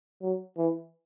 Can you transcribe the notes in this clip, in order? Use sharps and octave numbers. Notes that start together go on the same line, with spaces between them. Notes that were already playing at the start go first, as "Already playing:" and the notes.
F#3
E3